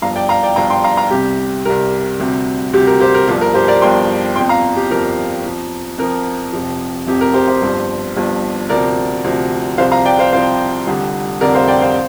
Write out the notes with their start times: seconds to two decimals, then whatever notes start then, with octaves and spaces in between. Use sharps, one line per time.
0.02 G1 G2 F3 F5 A#5
0.16 D5 G5
0.29 F5 A#5
0.43 D5 G5
0.56 G1 G2 F3 F5 A#5
0.70 G5 C6
0.84 F5 A#5
0.97 F5 A#5
1.10 C2 C3 G3 G4
1.65 C2 C3 G3 A#4
2.19 D2 C3 G3
2.73 D2 C3 G3 G4
2.87 A#4
3.00 G4 C5
3.14 A#4
3.28 G1 G2 F3 G4
3.41 A#4
3.54 G4 C5
3.68 A#4 D5
3.82 G1 G2 F3 G5 C6
4.36 G1 F2 F3 G5 C6
4.49 F5 A#5
4.76 G4
4.90 G1 F2 F3 A#4
5.45 F2 F3
5.98 F2 F3 A#4
6.53 F1 F2 C3 F3
7.07 F1 F2 C3 F3 G4
7.21 A#4
7.34 G4 C5
7.48 G4 C5
7.62 G1 G2 F3
8.16 G1 G2 F3
8.69 D2 C3 F3 A#4 D5
9.24 D2 C3 F3
9.78 C2 C3 F3 C5 F5
9.91 F5 A#5
10.05 D5 G5
10.19 C5 F5
10.33 C2 C3 F3 C5 F5
10.87 F1 F2 D3 G3
11.41 F1 F2 D3 G3 A#4 D5
11.54 C5 F5
11.68 D5 G5
11.82 C5 F5